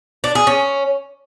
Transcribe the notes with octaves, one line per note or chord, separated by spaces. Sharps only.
D4
G#4
C#4